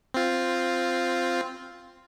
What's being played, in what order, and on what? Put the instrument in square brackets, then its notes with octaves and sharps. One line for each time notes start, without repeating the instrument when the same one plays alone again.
[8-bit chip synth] C4 F4